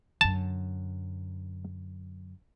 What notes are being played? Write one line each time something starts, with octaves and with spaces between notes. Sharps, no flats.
F#2 D3 A5